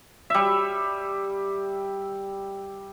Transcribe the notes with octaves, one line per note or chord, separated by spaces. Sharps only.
G3 E5